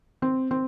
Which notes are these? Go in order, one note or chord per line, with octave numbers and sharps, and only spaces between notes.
C4
C4